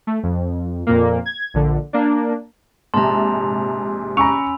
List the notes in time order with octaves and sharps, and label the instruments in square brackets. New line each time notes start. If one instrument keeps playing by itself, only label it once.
[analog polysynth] A3
F2
F2 A#2 A#3
G#6
A#1 D3
A#3 D4
[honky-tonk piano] A#1 G#2 C3 [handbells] A5 A#5 [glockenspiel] C6
[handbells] C#4 B5 [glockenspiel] G#5 E6 F7 [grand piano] A#5 C#6